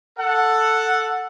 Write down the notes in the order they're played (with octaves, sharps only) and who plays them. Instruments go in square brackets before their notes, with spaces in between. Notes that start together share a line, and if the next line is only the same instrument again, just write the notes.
[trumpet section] A4 F#5